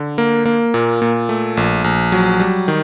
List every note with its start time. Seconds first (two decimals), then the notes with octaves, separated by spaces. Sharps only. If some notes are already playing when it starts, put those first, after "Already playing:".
Already playing: D3
0.18 A#3
0.46 A#3
0.74 A#2
1.02 A#2
1.29 A3
1.57 A#1
1.84 A#1
2.12 F#3
2.40 G3
2.68 D#3